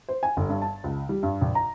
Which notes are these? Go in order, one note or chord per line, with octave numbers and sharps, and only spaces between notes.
C5
G#5
G1
G2
A5
C#2
G3
G2
A#1
A#5